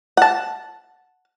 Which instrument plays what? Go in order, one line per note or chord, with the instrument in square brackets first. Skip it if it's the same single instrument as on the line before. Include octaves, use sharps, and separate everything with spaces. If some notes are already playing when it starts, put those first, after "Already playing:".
[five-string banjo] F#5 A5